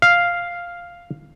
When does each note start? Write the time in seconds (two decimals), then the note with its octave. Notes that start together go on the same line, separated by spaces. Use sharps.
0.02 F5